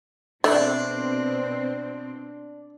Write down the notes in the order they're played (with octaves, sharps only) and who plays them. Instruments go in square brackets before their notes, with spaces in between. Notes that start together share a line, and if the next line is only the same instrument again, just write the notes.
[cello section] B2 C4 [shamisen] A3 [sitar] D4